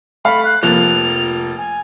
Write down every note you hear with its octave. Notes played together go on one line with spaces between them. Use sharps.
A3 F5 B5
F#6
F1 F3 A#3 F7
G#5